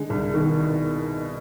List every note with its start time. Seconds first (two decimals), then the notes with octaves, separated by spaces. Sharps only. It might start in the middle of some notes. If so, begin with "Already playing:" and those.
Already playing: D3 G#3
0.10 C2
0.34 B2 D#3
0.59 B2